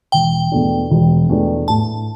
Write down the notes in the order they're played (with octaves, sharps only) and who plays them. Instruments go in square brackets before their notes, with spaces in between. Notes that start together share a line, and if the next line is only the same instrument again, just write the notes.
[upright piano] E1 [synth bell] G5
[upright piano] E2 B2 A3 D4
E1
E2 B2 A3 D4
[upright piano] A2 [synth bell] A5